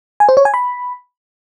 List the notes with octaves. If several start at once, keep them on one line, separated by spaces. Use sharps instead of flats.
G#5
C5
C#5
G#5
B5